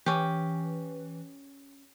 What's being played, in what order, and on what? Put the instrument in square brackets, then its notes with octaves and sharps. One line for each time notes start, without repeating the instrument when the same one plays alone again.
[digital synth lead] E3 [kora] C#4 G4